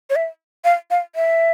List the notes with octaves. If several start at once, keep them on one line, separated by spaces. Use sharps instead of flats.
C#5
E5
F5
F5
E5